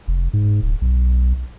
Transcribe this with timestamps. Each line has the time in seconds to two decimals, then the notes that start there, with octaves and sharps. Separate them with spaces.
0.08 F1
0.33 G#2
0.62 D1
0.81 B1